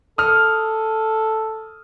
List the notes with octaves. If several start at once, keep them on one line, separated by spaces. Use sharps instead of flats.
A4 D#6 F6